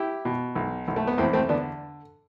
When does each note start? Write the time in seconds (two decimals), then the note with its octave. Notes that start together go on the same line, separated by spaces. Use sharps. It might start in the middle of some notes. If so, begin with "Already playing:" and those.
Already playing: E4 G4
0.25 B2
0.55 B1
0.88 B1
0.96 A3
1.07 B3
1.18 E2 A3 C4
1.33 A3 C4
1.49 D3 B3 D4